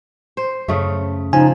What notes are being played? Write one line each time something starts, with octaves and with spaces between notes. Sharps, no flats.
C5
F#2 C#3 A3
C#3 F3 D#4 G#5